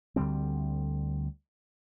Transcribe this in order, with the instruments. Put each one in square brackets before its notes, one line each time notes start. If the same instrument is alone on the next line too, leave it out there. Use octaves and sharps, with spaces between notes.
[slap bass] D2 D3 G3 C4